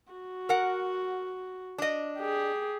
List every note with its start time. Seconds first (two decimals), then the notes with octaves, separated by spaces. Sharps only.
0.12 F#4
0.49 A#4 F#5
1.78 D4 D#5
2.19 G4 G#4